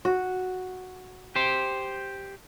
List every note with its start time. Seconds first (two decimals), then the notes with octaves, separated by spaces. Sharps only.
0.05 F#4
1.36 G4 C5